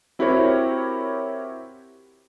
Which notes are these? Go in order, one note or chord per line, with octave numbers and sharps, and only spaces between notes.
C4 E4 F#4 G4 A#4 C#5